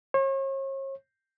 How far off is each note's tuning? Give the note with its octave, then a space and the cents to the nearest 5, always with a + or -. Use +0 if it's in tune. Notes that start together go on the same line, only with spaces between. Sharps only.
C#5 -40